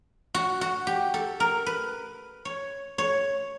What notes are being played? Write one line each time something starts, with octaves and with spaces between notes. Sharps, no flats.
F#4
F#4
G4
A4
A#4
B4
C#5
C#5